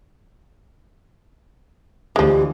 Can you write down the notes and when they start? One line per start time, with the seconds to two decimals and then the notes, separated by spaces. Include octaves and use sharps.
2.16 D2 E3 F3 G#3 G4